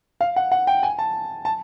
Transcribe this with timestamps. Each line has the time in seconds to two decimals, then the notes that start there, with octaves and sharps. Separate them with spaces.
0.21 F5
0.36 F#5
0.52 F#5
0.67 G5
0.83 G#5
0.99 A5
1.45 A5